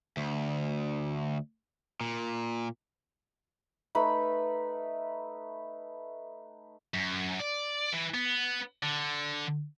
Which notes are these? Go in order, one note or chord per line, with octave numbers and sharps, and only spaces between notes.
D2
A#2
A3 D#4 B4 B5
F#2
D5
E3
B3
D3